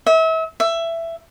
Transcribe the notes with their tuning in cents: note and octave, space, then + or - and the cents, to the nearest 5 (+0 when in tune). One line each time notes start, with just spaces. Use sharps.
E5 -35
E5 +15